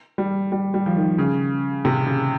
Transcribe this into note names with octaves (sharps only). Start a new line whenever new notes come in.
G3
G3
G3
F3
D#3
C#3
C3
C#3